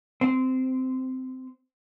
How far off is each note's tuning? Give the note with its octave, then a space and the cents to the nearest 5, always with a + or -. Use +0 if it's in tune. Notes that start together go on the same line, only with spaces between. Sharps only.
C4 -15